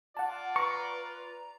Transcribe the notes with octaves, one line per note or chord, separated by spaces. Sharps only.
F4 D5 F#5 A5
B4 A#5 C#6